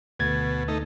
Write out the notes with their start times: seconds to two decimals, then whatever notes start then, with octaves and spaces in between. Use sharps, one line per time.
0.19 D2 B2 G#6 A6
0.68 A3 D#4